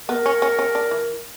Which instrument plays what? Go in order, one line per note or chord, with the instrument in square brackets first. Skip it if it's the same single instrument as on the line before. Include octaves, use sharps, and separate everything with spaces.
[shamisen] B3 [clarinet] A#4
[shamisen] C#4
C#4
C#4
D4
E3